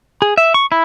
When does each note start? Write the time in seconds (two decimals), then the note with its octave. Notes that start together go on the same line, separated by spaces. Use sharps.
0.22 G#4
0.38 E5
0.54 C#6
0.72 E4